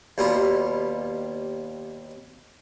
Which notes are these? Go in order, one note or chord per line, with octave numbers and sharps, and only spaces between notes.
D#2 B2 G3 F4 B5